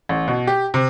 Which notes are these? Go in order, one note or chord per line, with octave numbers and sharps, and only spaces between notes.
A1
B2
G4
C3